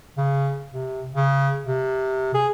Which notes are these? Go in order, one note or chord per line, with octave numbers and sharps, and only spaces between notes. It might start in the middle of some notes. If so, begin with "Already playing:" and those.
C#3
C3
C#3
C3
G#4